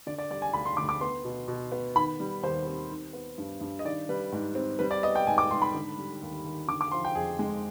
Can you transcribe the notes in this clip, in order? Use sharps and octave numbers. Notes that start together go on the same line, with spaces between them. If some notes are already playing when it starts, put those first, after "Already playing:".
D3 D5
D5
G3 D5
G#5
D2 B5
C6
D2 D6
D6
B3 C6
B2
B2
B3
D#3 B5
G3
D#2 C5
C4
D#3
B3
G2
G2
D#5
D#3 D5
G3 B4
G#2
C4
G3 B4
D5
B3 D#5
G5
G#2 G#5
D6
G#2 C6
B5
D3
G3
D#2
D#2
D3 D6
D6
F3 C6
G5
F2 G#4
G#3